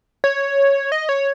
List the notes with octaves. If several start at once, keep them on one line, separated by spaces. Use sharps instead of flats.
C#5
D#5
C#5